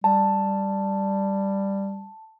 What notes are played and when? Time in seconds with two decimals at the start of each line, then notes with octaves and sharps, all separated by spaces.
0.04 G3 A5